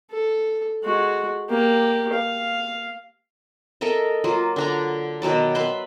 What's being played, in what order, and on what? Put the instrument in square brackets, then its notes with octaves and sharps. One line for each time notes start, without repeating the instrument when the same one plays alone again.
[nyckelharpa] A4
G#3 F#4
A#3 G4
F5
[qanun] A4 A#4 D#5 E5
F#3 A#3 F4
D3 D4 A#5
B2 D#3 F#3 D5
B4 E5 B5 C6